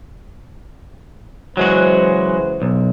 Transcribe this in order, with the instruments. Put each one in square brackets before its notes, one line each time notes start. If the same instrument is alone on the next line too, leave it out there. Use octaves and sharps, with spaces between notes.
[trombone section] C#3 E3 C5 [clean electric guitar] F#3 G#3 F#4
[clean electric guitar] B1